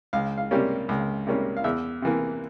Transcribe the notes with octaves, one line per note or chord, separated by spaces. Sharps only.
C#2 F5
F5
C3 G3 A#3 C#4
C#2
C3 G3 A#3 C#4
F5
E2 E5
C3 E3 A#3